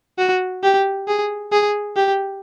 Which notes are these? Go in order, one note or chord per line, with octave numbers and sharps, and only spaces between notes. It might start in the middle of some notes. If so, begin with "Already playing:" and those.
F#4
G4
G#4
G#4
G4